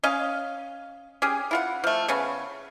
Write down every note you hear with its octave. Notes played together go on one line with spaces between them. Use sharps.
C#4 D#5 F5
C#4 G4 G#4
E4 F4 F#5
F3 A3
C#3 B3 C#4